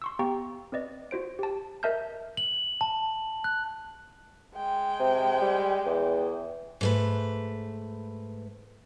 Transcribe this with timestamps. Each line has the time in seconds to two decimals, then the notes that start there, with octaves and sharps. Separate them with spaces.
0.02 C6 C#6 E6
0.19 B3 G4 F5 G5 A#5 C#6
0.72 C4 B4 D5 D#5
1.11 F4 F#4 C5 D7
1.39 G4 A5
1.83 A#4 D#5 E5 A5 F6 G6
2.37 F#7
2.81 A5
3.44 F#6
4.55 G#3 G5
5.00 C3
5.42 G3
5.86 E2
6.81 G#2 A3 B4